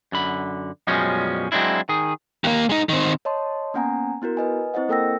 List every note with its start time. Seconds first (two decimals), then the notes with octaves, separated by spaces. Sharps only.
0.12 F#2 D3 B5
0.87 F#2 B2 F3 G3 G#3 C#4
1.52 F#3 G#3 C4 D4 E4
1.89 D#3 G#4
2.44 D#2 A#3
2.69 G#3 D#4
2.89 D#3 C4
3.25 C#5 D#5 A5 C6
3.74 A#3 B3 C#4 F#5 G#5 A#5
4.22 B3 E4 F#4 A#4
4.37 B4 D#5 G#5
4.74 C4 E4 C5 D#5 F#5
4.89 A#3 A4 A#4 G5 E6 A#6